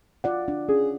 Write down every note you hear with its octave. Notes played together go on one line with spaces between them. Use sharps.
F4 D5 F#5
D4
C#4 G#4